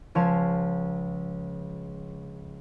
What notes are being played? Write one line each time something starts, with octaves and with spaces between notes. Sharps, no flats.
C#2 F3 C#5 F5 A5 G#6